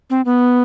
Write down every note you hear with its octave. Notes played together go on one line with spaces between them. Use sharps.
C4
B3